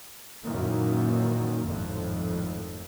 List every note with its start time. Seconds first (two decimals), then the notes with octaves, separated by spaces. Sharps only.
0.43 F#2 A#2 D#3 E3 A#3
1.65 G#1 F2 A2